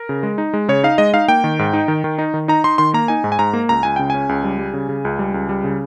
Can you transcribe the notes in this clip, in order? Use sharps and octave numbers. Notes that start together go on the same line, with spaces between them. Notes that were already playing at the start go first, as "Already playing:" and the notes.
Already playing: A#4
C#3
G#3
D#4
G#3
C#3 C#5
D#4 F5
G#3 D#5
D#4 F5
A#3 G5
D#3
G#2
D#4
D#3
D#3
D#4
D#3
D#4 A#5
D#4 C6
D#3 C6
A#3 A#5
D#4 G#5
G#2
G#5
G#2 A#5
A#3
C#2 A#5
C#2 G#5
C#3 G5
C#4 G#5
C#2
G3
G3
C#3
C#3
C#2
G3
C#2
G3
C#3